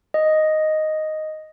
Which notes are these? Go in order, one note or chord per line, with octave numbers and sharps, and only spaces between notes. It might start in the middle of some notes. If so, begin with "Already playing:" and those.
D#5